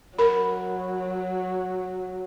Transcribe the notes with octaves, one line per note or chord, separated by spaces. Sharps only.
F#3 A#4 B5